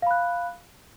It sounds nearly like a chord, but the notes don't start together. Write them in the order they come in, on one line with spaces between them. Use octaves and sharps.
F5 B5 F#6